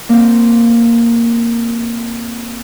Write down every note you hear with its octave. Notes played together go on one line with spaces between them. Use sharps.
A#3 C4